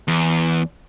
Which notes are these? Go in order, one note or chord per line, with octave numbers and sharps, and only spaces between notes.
E2